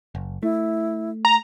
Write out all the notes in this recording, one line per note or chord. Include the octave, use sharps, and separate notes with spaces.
F#1
A3 E4
A#5